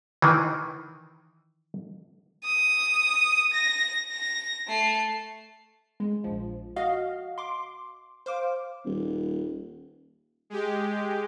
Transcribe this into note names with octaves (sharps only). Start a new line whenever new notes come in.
D#3 E3
D#6
A#6
A#6
A3 C7
G#3
A#1 F3
F#4 D#5 F5
C6 D6
C5 F5 D6
D#1
G#3 G4